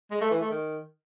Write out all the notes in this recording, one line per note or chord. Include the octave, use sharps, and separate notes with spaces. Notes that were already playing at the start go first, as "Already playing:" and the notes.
G#3
A3
E3
A3
D#3